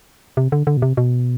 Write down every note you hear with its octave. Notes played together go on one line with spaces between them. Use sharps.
C3
D3
D3
B2
C3
B2